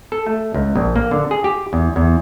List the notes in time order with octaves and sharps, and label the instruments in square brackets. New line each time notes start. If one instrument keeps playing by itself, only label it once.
[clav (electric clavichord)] A4
A3
C#2
A#1
A#3
D3
G#4
G4
E2
E2